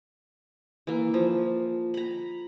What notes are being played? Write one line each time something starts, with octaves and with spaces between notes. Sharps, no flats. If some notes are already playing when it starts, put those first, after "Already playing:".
E3 A#3
F3
A#5 B5